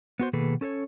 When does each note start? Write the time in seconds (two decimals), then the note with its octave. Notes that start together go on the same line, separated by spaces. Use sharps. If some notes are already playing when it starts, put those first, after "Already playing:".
0.19 B3 F#4 C5
0.33 B2 D#3 A#3 G#4 A4 B4
0.61 C#4 A4 B4 C#5